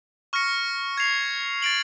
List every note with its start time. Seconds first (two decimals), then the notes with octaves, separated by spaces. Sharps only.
0.33 C#6 F6 A#6 C#7
0.97 G#6 C7 F7
1.62 A6 D7 F#7